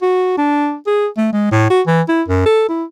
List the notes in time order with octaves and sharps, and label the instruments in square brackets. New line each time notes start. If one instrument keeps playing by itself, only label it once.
[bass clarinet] F#4
D4
G#4
A3
G#3
A2
F#4
E3
E4
F#2
A4
E4